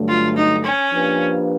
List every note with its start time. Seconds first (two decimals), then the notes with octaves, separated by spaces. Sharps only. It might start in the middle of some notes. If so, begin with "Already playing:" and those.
Already playing: G2 D3 F#3 A3
0.08 F4
0.36 D#4
0.64 C#4
0.92 F3 A#3 D4 G4 B4